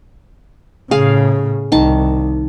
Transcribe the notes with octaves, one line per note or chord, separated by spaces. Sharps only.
A2 C#3 G#4 F5
C2 D#3 A5